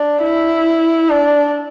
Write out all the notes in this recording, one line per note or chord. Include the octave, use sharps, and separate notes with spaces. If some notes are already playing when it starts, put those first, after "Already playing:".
Already playing: D4
E4
D4